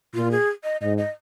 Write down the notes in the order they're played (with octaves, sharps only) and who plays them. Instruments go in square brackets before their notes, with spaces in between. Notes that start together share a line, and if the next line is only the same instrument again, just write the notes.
[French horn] A#2 [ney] F4
[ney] G#4
D#5
[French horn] G#2 [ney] D#5
[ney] D#5